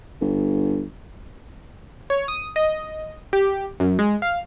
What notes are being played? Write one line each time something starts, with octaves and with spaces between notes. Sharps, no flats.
G1
C#5
D#6
D#5
G4
F#2
G#3
F5